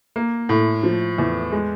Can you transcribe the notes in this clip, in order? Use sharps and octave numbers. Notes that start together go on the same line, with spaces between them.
A#3
A2
F3
E2
G#3